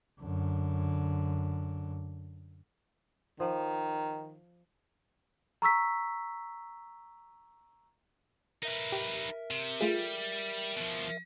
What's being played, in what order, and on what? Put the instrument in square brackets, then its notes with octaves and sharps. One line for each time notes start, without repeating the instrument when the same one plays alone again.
[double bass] F#2 D3
[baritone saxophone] D#3 [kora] F3
[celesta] A#5 C#6 E6 B6
[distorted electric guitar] D#4 B4 [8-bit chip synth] A#4 E5
[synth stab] G4
[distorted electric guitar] C3
[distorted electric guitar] G3 [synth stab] A3 F4 G#4
[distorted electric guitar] B2 F3